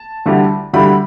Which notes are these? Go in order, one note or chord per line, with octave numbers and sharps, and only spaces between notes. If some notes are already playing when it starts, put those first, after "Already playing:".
Already playing: A5
D2 D3 G3 E4
D2 D3 G3 E4 B5